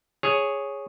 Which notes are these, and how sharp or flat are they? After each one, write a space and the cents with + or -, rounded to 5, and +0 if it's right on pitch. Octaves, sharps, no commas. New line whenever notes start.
G#4 +0 C#5 +0